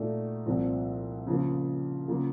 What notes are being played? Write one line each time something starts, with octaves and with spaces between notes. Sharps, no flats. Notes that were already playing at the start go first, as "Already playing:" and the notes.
Already playing: A#2 A3 D#4 F#4
C2 A#2 F3 C4
C#3 F3 A#3 F4
C#3 F#3 A#3 F4